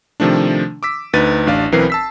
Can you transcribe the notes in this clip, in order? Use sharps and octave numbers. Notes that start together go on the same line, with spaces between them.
C3 D#3 F3 A3 D4
D6 E6 B6
D2 D#4 B4 A6 D#7
A1 D4 F5
B1 E3 C4 A#4 B4 C7
A5 E6 B6